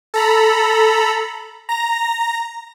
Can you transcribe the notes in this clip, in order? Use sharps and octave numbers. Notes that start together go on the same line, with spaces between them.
A4 A#5 B5
A#5 A#6